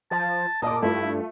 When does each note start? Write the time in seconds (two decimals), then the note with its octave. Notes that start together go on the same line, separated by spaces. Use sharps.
0.11 F3 A5
0.62 A#2 D#5 A5 D6
0.83 G2 A3 E4 F4